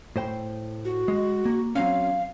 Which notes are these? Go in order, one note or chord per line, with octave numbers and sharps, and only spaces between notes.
A2 C5 G5
F#4
G#3
A#3
F#3 C4 C#4 F5